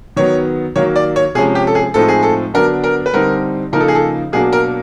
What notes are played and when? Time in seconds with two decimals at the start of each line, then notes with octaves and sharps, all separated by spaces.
0.16 D#3 F#3 B3 C#5
0.76 D#3 F#3 A#3 C#5
0.96 D5
1.16 C#5
1.35 C3 F3 G#3 C#4 G#4
1.55 G4
1.67 A4
1.75 G#4
1.94 A2 F3 G#3 C4 D#4 A4
2.08 G#4
2.23 A4
2.54 D3 F#3 B3 D4 A#4
2.84 A#4
3.06 B4
3.13 D3 G3 C4 D#4 A#4
3.72 C#3 F3 A#3 D#4 A#4
3.80 A4
3.88 G#4
3.95 A4
4.33 B2 F#3 A#3 D4 G#4
4.53 A#4